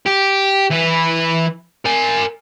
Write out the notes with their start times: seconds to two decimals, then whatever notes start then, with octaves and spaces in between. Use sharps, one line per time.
0.06 G4
0.71 E3 B4
1.86 A#4 G#5